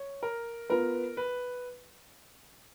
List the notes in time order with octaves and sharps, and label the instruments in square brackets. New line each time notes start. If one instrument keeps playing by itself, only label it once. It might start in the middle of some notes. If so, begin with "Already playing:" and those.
Already playing: [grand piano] C#5
A#4
[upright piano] B3 F4 B4 [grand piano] A#4
[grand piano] B4